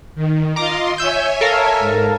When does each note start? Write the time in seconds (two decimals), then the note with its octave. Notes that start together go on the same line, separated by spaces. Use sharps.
0.15 D#3
0.56 F4 D#5 A#5 C6 D6
0.98 C#5 E5 G#5 E6 G6
1.41 A4 A#4 F5
1.79 G#2